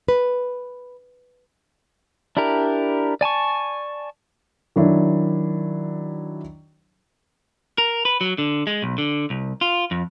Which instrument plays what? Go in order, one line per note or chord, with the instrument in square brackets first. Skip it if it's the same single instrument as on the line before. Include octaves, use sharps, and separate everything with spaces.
[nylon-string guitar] B4
[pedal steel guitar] D4 E4 G4 A#4
D5 G#5 A5 C#6
[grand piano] D#3 F#3 D4 E4
[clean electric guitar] A#4
B4
F#3
D3
G#3
B1
D3
C2
F4
F2